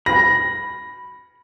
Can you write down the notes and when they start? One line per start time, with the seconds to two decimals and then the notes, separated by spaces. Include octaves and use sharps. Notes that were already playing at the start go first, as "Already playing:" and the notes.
0.06 B5 A#6